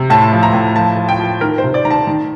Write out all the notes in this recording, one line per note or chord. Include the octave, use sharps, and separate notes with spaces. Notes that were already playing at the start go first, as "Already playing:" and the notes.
Already playing: C3
A2 A5
F3
A#5
A2
F3 A5
F3
G5
F3
D#3 A#4
C5
C3
D5
D#3 A#5
A5
D#3